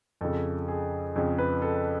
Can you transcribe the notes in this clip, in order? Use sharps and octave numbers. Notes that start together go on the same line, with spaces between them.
F2 C#3 A4
G#4
F2 C#3
B4
A4